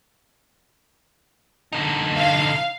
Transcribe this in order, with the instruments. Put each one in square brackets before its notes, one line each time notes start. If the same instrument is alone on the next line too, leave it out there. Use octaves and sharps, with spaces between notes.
[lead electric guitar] D3 D#4
[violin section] F5